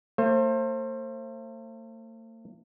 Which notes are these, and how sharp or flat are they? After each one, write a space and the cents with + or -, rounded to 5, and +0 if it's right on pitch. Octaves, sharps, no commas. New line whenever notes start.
A3 +45 C5 +30